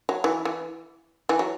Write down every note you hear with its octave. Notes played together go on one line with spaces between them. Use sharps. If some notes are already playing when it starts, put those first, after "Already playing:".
F#3
E3
E3
E3
F#3